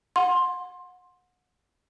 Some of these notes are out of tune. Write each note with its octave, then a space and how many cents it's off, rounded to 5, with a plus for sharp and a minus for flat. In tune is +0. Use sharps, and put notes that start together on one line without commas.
F#5 -30 C6 +10